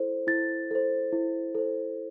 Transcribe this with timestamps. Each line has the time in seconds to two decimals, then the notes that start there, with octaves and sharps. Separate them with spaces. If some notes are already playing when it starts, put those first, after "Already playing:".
Already playing: E4 A4 C5
0.27 E4 A6
0.71 A4 C5
1.12 E4
1.55 A4 C5